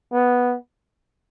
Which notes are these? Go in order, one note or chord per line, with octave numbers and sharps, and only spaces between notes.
B3